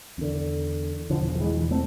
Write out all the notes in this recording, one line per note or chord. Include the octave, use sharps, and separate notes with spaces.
E2 D3
E2 B2 D3 F3
F3
E3 G#3
A3 C4